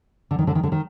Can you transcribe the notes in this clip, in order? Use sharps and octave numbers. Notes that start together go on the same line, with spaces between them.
D3
D#3
D3
D#3
D3
D#3